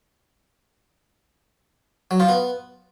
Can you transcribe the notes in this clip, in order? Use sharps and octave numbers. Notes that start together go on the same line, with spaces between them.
F#3
F4
B3